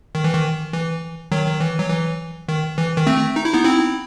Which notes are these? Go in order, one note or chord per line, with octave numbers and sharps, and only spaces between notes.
D#3
E3
D#3
E3
D#3 F#3
D#3
E3
F#3
E3
D#3
E3
D#3
A3 C4
D#4
E4
B3 D#4
C4 E4